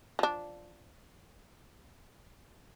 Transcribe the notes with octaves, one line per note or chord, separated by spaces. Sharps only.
F3 D4